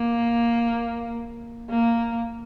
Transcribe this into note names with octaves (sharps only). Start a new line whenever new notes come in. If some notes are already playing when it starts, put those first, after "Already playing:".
Already playing: A#3
A#3